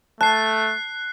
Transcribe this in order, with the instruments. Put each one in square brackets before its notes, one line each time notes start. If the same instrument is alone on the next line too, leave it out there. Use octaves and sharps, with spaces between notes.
[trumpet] A3 [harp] A5 [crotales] F#6 C7